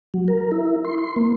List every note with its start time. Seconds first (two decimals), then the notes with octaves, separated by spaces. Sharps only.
0.14 F#3
0.28 A#4
0.52 E4
0.85 C6
0.98 C6
1.16 A#3